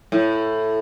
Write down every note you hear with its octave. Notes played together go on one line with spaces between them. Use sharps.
A2